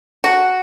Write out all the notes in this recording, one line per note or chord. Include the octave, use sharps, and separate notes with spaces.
F#4